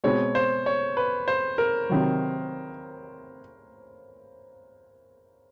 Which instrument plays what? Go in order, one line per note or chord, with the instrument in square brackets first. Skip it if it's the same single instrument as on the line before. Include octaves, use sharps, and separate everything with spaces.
[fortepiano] B2 G#3 C4 [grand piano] C#5
[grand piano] C5
C#5
B4
C5
A#4
[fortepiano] C3 D#3 F#3